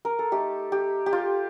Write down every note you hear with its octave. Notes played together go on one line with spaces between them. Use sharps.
A#4
A4
A3 D#4 G4
G4
G4
F4